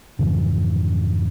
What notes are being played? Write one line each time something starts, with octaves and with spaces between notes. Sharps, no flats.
F2 G#2 C#3 E3